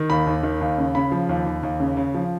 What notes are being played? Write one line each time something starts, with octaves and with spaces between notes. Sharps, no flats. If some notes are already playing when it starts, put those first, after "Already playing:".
Already playing: D#3
D#2 B5
D#2
D#3
D#2
C#3
C#3 B5
F3
D#2
D#2
D#2
C#3
C#3
F3